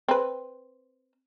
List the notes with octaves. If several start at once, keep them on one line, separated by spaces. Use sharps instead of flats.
C4 B4